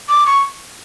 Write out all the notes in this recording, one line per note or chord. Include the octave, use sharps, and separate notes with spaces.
D6
C#6